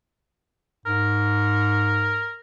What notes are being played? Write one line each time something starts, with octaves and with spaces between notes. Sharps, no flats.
G#2 A#4